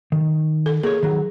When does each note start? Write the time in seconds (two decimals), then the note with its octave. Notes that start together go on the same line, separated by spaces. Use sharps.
0.12 D#3
0.66 A4
0.83 A#3 G#4 C#5
1.03 D#3 F#3